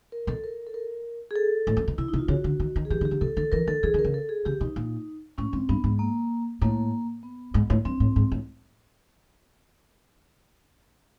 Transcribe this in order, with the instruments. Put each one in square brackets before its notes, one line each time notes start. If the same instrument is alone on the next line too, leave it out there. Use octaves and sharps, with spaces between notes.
[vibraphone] A#4
[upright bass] B2 [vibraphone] A4
[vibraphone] A#4
A4
A#4
G#4
A4
[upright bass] A2
F#2
B2
[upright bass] C3 [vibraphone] E4
[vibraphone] D#4
[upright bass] C3
[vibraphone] F4
[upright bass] C#3 [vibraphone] F#4
[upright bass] D3
D#3
D#3
[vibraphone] G#4
[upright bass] E3 [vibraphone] G4
[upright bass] D#3
[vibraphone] G4
[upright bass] D3
[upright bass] C3 [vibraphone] A4
[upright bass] D#3 [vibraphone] A4
[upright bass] E3 [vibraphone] A#4
[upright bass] D#3 [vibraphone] A4
[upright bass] E3 [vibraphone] G#4
[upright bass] D#3
[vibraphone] A#4
[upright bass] C#3
[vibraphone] A4
G#4
[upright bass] C#3 [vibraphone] G4
[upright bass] B2 [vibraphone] D#4
[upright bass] A#2
[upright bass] A2 [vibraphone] C#4
[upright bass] G#2 [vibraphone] C4
[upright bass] G2 [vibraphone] B3
[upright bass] G#2
[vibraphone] A#3
[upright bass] A2 [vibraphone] A#3
[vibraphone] B3
[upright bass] G#2
A2
[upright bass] G2 [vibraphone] C4
[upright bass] A2
G#2
A2